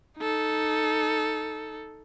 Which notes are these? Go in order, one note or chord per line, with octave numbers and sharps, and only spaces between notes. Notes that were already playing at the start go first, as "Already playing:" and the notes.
D#4 A4